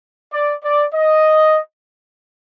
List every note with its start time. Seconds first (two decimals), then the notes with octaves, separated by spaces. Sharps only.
0.33 D5
0.64 D5
0.94 D#5